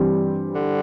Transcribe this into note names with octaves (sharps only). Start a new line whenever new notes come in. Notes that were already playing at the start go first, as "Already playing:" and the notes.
Already playing: G2 E3 G3 C4
D3